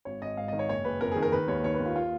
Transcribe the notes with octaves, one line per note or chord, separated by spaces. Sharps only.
G#1 C#5
G#1 D#5
G#2 F5
D#5
D#3
C#5
F#1 C#5
F#1 B4
F2 A#4
G#4
D#3
A#4
D#3 B4
D#2 C#5
D#3 C#5
B4
D#2
F4
F4